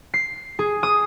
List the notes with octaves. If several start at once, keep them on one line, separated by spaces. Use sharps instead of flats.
C7
G#4
D#6